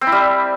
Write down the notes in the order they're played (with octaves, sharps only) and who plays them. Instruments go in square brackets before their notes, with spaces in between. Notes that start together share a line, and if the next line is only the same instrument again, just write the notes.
[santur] C4
E4
G3